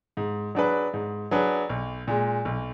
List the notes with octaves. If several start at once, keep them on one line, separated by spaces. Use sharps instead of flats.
G#2
F#3 D4 G#4 B4
G#2
F#3 D4 G#4 B4
B1
A#2 G#3
B1